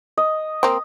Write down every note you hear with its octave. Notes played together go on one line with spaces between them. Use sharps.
D#5
A#3 C4